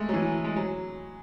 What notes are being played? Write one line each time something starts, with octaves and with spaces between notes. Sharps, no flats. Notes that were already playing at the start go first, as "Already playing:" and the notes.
Already playing: G#3 A3
F#3
E3
G#3
F#3